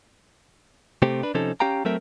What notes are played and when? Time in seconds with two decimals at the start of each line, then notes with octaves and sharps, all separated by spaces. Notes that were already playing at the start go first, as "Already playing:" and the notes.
1.02 C3 A3 C4 G4
1.23 D4 B4
1.34 C3 F3 C#4 D#4 A4
1.60 C#4 G4 F5 G5 A#5
1.85 F#3 A3 C4 A4 A#4 E5